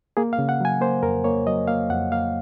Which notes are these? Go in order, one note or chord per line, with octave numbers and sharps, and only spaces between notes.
A#3 G#4
F5
C#3
F#5
F#3 G#5
A#3 C5
F2 A#4
A#3 C#5
F#3 D#5
A#3 F5
F2 F#5
A#3 F5